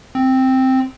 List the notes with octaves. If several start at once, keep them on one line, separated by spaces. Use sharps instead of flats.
C4